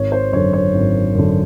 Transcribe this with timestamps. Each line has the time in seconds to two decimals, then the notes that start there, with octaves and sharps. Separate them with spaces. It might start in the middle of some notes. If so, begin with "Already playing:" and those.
Already playing: G#1 C#5
0.12 C5
0.32 F#2 D3 C#5
0.53 C#5
0.74 G#1
1.15 F#2 D3